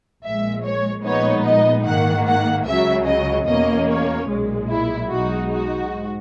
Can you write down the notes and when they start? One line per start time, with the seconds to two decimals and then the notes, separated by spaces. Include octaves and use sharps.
0.23 A#1 A#2 G#3 E5
0.64 C#5
1.04 A#1 A#2 G#3 B3 D#4 C#5
1.45 D#5
1.85 G#2 D#3 A#3 F#5
2.26 F#5
2.66 C#2 C#3 F#3 E5
3.07 D#5
3.47 E2 B2 A#3 C#4 D#5
3.88 C#5
4.29 B1 A#2 G#3
4.69 E4
5.09 B1 B2 G#3 D#4 F#4
5.50 F#4
5.90 G#2